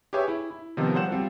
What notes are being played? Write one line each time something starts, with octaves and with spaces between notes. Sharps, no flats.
G4 G#4 B4 C#5 E5 G#5
E4
E4
C3 D#3 F3 B3 D#4
F#3 G3 C5 F#5 E7
G3 C4 F4 A4